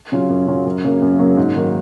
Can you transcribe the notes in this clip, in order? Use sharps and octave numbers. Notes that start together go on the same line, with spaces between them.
C#3 F#3 C#4 F4
F#2
C#3 F#3 C#4 F4
F#2
C#3 F#3 A#3
F#2
C#3 F#3 A#3
G#2
D#3 F#3 A#3